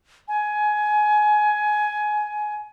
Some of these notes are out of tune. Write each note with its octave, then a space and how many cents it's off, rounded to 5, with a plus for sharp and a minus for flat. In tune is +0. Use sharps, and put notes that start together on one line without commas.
G#5 +20